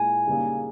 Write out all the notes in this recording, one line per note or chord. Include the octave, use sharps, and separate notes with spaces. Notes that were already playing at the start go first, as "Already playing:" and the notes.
Already playing: A#2 G#3 E4 G#5
C#3 G3 A#3 D#4 G#4